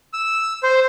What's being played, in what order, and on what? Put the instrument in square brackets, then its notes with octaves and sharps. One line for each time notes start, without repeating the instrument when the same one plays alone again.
[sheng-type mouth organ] E6
C5